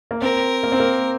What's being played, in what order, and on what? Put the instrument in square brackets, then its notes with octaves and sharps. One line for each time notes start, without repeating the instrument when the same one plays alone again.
[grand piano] A#3
[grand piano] C4 [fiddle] A#4
[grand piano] A#3
C4
A#3